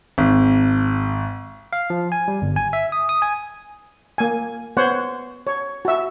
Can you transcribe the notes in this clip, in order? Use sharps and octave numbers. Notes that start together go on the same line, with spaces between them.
G#1
F5
F3
G#5
G3
G1
G#5
E5
D#6
D#6
G#5
A#3 G#5
B3 C5 C#5 F#5
C#5
F#4 E5